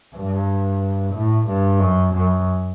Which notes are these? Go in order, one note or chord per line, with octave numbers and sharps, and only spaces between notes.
G2
A2
G2
F#2
F#2